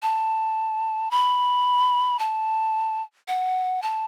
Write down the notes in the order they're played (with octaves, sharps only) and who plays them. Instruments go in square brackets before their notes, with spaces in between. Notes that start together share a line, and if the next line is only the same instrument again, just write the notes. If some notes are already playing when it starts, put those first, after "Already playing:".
[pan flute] A5
B5
A5
F#5
A5